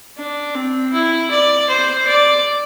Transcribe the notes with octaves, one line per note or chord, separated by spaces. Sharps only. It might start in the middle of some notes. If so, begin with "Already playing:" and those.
D4
C4
E4
D5
C5
D5